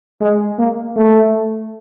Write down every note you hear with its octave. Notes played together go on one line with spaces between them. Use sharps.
G#3
A#3
A3